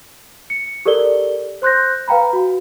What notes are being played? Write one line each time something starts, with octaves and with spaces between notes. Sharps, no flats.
C#7
G4 A4 A#4 D5 G7
C5 C6 F#6 G6 A#6
B4 F5 G5 A#5 B5
F#4